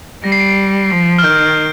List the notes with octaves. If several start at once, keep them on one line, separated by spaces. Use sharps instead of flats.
G3 A#6
C7
D7
C7
F3
F6
D#3 G6